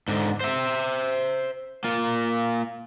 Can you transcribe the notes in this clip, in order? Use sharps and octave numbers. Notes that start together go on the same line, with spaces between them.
G#2 D3
C5 E5
A#3 F4